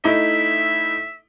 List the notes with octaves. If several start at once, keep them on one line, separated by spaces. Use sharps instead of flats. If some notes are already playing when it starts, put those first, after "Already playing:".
A3 D#4 E4 E5